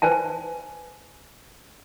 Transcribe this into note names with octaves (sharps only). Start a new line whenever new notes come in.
B4 C5 G#5 A5